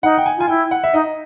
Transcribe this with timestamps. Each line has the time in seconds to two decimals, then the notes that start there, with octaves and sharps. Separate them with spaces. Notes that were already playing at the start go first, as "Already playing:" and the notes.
0.03 D#4 F#5
0.18 G5
0.26 G#5
0.37 F4 G#5
0.48 E4 G5
0.71 F#5
0.83 E5
0.93 D#4 D#5